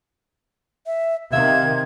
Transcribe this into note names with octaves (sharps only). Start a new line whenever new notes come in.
E5
C3 D#3 E5 F5 G#6